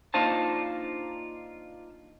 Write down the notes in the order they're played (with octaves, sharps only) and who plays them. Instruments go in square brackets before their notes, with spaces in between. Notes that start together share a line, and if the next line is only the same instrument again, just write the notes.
[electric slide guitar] A#3 D4 D#4 F4 C5 A5